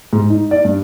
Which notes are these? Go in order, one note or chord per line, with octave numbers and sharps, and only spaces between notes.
G#2
D#4
D5
G2